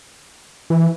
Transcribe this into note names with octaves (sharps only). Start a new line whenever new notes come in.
E3